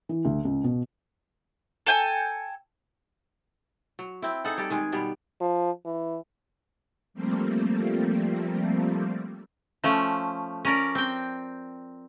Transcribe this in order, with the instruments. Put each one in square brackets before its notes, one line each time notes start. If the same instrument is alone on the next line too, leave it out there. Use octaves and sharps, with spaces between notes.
[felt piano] E3
D2
C#2
B2
[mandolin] A4 G5 G#5
[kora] F#3
C4 E4
D#4 G#4 A4 F#5
G3 G4 A4
D#3 G#3 G#4
B2 G3 B3
[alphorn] F3
E3
[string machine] F3 G3 A3 A#3 C4
[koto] F3 A3 C#4
C#4 A#4 D5
C4 G5